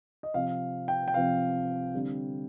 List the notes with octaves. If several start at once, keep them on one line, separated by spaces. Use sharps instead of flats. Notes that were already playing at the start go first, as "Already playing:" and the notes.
D#5
C3 F3 C4 F5
G5
G5
C3 F3 C4 F5
D3 G3 C4